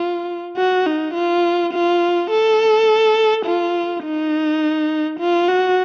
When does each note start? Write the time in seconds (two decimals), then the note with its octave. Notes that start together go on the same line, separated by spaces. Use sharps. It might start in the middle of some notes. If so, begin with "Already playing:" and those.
Already playing: F4
0.57 F#4
0.87 D#4
1.14 F4
1.73 F4
2.31 A4
3.46 F4
4.04 D#4
5.20 F4
5.49 F#4